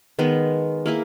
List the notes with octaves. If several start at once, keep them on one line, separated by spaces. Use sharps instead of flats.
D#3 G#3 B3
A#3 E4 G#4